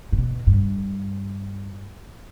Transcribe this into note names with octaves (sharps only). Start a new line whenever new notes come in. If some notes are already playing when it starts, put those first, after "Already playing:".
A2
B2
G2